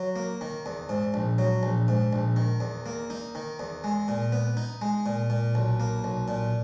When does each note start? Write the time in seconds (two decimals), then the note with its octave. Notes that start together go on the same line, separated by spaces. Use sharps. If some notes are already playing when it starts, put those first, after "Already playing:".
Already playing: F#3
0.16 A#3
0.41 D#3
0.66 E2
0.89 G#2
1.14 A#1
1.38 F#3
1.63 A#1
1.88 G#2
2.13 A#1
2.36 D#3
2.60 E2
2.86 A#3
3.10 D#4
3.35 D#3
3.59 E2
3.84 G#3
4.08 A#2
4.32 B3
4.57 D#4
4.82 G#3
5.06 A#2
5.30 A#2
5.55 B1
5.80 A#3
6.04 B1
6.28 A#2